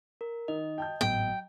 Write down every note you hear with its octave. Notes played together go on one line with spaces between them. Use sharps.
A#4
D#3 D#5
G5 A5 G6
G#1 A2 F#3 B3 G5